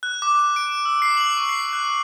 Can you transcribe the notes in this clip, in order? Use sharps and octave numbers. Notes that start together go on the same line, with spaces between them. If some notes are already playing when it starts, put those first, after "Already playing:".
F#6
D6
E7
D7
E6
C7
F#7
C#6
C7
F#6